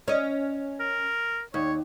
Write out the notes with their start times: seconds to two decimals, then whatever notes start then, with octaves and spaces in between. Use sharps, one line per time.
0.08 C#4 D#5
0.80 A#4
1.54 D#2 C#5